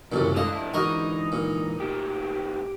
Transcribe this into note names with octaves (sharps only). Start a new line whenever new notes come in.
C2 F#2 A#2 C#3 E3 A4
A2 D3 G#3 A4 D#5 F5
F2 D4 E4
G#2 D3 E3 D#4 F#4 A#4 D#5
A#2
A2 D#3 G4